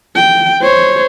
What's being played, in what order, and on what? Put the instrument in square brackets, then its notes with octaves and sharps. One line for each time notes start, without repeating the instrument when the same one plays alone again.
[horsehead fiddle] G5
C5 C#5